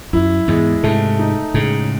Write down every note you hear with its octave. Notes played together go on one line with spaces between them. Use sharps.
F#2 E4
E2 G#2 G#3
G#2 C3 A3
D#4
A2 C#3 G#3